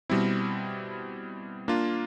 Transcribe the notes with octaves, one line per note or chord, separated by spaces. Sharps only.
B2 G3 C4 E4
A#3 D4 F4